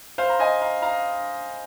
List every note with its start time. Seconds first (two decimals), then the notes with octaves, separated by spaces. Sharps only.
0.18 C5 F5
0.29 A#5
0.40 D#5 G#5
0.61 F5 A#5
0.82 F5 A#5